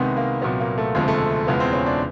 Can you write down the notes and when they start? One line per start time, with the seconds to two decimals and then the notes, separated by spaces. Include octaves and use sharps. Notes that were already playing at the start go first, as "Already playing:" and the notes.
Already playing: C2 C3 D#3 G#3 B3
0.17 A#3
0.42 C2 A#2 F#3 B3
0.60 A#3
0.78 A3
0.95 E1 D2 C3 F3 G#3
1.08 A3
1.47 E1 E2 C#3 F3 G#3 B3
1.60 C4
1.73 C#4
1.86 D4